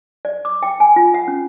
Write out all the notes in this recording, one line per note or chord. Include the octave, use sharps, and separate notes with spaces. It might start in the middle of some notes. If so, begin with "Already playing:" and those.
D5
D6
G5
G#5
F4
F#5
C#4